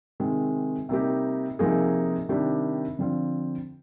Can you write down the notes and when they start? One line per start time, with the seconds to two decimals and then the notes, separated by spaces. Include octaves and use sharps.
0.20 C3 D#3 G#3 C4
0.89 C3 G3 A#3 D#4 G4
1.59 C3 F3 A#3 D#4 G#4
2.29 C3 D#3 G3 D4 G4
2.99 D3 F3 C4 F4